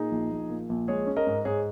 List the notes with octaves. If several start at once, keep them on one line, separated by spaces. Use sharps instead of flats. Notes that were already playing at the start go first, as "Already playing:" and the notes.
Already playing: A#2 D#4 G#4
A#1
A#1
A#2
A#1
G#3 G#4 C#5
C#4
A#4 D#5
G#2
G#2 G#4 C#5